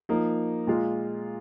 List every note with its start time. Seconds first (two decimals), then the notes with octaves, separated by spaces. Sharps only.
0.09 F3 A#3 D#4
0.67 A#2 G#3 F4